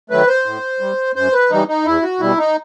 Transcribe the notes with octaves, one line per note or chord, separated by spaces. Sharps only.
D#3 F#3 A3 B4
C5
A2
G3
F#2 C5
B4
E3 G3 D#4
D#4
E2 E4
F#4
B2 G3 E4
D#4